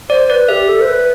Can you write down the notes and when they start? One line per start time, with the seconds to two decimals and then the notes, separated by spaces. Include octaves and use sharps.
0.10 C5 D5
0.30 B4 D5
0.48 G4 E5
0.68 A4
0.81 C5
0.88 B4